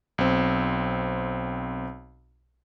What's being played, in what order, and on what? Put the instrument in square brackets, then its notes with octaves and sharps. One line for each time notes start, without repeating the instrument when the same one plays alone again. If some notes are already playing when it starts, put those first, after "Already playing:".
[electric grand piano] B1 C4